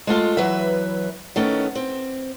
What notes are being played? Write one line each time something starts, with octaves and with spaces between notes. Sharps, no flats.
G#3 A3 F4 A4
E3 F#3 B4 E5
D#3 A3 B3 C#4
C4